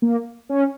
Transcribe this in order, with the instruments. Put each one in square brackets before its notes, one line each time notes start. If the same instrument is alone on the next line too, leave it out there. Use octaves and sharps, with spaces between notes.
[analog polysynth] A#3
C#4